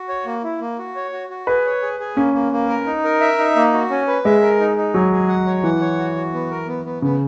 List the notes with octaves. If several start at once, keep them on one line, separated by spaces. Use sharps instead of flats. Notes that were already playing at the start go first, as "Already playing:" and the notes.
Already playing: F#4
C#5
A#3
E4
A#3
F#4
C#5
F#4
F#4
G#4 B4
C#5
G#4
G#4
A#3 C#4
A#3
A#3
A#4
D#4
A#4
E5
D#4
A#3
F#4
C#4
B4
G#3 E5
A#4
D#4
D#4
F#3 G#4
G#4
F#5
C#5
E3 F#5
C#5
F#4
F#4
B3
A#4
B3
B3
C#3 B3